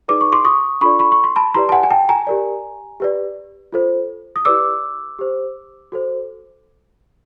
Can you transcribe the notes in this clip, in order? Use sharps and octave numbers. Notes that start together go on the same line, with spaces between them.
D#4 G#4 B4 D5 D6
C#6
C6 D6
C#6 D#6
D4 F4 A4 D5 B5 C#6
B5 C#6
C#6
C6
A5 B5
E4 G4 B4 D5 A#5 C6
A5
F#5 G#5
G#5
G5 A5
G#5 A#5
G4 A#4 D5
G4 B4 D5
F4 A4 C5
D#6
E4 G4 B4 D5 D6 E6
G4 C5
F#4 A4 C5